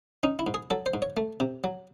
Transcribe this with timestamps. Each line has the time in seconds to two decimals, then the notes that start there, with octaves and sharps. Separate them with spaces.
0.23 C#4 D#4
0.39 E4
0.47 G#2
0.54 G#4
0.70 F#3 A4
0.86 C5
0.94 G#2
1.02 C#5
1.17 A3
1.40 C3
1.64 F#3